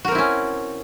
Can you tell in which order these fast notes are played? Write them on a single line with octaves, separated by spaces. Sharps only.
F#4 A#4 C4 E4 C#4